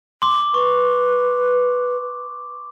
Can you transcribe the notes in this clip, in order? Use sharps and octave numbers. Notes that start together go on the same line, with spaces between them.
C6 D6
B4 C#6